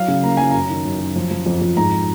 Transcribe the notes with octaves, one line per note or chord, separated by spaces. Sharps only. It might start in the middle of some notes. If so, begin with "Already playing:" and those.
Already playing: F#3 F5
C#3
A#3 A#5
F#3 G#5
F#2 A#5
D#3
F#2
F#2
F3
F3
F2
F2
G#2 A#5